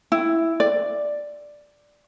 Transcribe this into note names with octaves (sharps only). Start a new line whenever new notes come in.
E4
D5